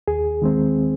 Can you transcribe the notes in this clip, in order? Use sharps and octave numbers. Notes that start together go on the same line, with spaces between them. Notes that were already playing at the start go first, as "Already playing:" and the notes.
D#2 G#4
D#3 G#3 C4